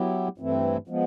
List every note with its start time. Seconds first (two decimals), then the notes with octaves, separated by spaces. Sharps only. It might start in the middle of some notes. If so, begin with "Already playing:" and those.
Already playing: F#3 B3 E4 G4
0.38 G2 E3 A3 C4 E4
0.87 F3 G#3 B3